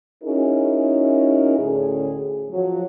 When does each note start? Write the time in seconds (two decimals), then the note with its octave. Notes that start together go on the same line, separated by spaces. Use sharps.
0.24 C#4 D#4 E4 F#4 G#4 A#4
1.60 D2 A2 D3 C#4 G#4
2.51 F3 F#3